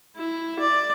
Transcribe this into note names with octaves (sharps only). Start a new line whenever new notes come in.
E4
D5